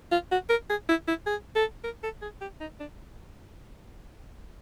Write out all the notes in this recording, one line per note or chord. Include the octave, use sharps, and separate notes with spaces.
F4
F#4
A#4
G#4
E4
E4
G#4
A4
A#4
A4
G#4
G4
D#4
D4